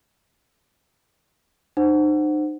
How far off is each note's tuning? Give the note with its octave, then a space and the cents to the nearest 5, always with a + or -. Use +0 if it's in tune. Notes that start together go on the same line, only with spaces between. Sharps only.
D#4 -40 C5 +0 F#5 +0